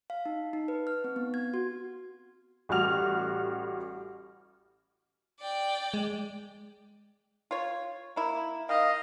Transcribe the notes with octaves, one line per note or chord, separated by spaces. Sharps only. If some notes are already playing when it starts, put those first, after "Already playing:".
F5
D#4
D#4
B4
F6
C4
B3
G#6
F#4
A1 G3 F#4 F6 F7
D5 G5
G#3
F4 C#5
A#3 E4
D#3 D#5 F5